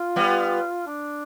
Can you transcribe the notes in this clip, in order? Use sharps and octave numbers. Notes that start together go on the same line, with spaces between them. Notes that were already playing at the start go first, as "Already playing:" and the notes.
Already playing: F4
G3 B3
D4